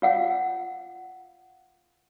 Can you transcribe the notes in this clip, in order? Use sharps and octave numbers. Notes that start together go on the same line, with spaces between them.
F4 F5 F#5